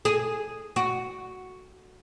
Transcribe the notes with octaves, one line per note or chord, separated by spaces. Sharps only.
G#4
F#4